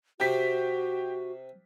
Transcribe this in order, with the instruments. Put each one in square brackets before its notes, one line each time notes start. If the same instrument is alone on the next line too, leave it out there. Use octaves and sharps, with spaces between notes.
[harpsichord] C3 C4 [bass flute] F#4 [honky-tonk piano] G4 B6